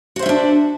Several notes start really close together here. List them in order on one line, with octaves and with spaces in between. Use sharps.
F#4 C5 E5 C#4 D4